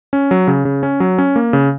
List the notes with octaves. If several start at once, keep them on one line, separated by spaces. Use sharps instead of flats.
C#4
F#3
C#3
C#3
C#4
F#3
C#4
A#3
C#3